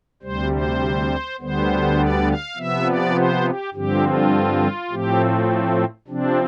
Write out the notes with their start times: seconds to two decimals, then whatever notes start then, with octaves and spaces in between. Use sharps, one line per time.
0.22 D2 C3 G3 C5
0.52 C5
1.40 D2 D3 G3 B3 C5
1.98 D5
2.28 F5
2.57 C3 F3 B3 E5
2.86 D5
3.15 C5
3.45 G4
3.74 G2 D3 F3 C4 G4
4.03 F4
4.91 A2 F3 A3 C4 G4
6.08 C3 F3 C4 D4